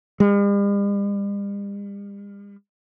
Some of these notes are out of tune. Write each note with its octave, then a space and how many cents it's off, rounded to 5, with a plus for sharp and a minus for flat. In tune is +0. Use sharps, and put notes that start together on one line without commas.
G3 +45